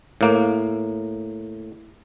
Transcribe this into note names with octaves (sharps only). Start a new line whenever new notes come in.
A2 A#3